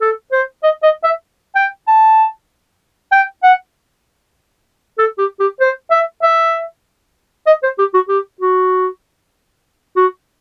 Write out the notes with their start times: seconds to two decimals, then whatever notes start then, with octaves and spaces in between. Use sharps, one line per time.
0.01 A4
0.32 C5
0.63 D#5
0.83 D#5
1.04 E5
1.55 G5
1.88 A5
3.12 G5
3.43 F#5
4.99 A4
5.18 G4
5.40 G4
5.60 C5
5.91 E5
6.23 E5
7.47 D#5
7.63 C5
7.79 G4
7.94 F#4
8.09 G4
8.41 F#4
9.96 F#4